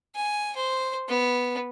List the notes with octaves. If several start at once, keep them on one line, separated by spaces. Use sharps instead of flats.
G#5
C5
B3